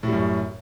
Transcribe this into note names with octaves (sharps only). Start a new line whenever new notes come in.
F#2 A2 G3